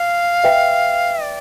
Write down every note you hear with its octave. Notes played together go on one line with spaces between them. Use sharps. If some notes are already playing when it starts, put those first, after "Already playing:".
Already playing: F5
B4 E5 G5
D5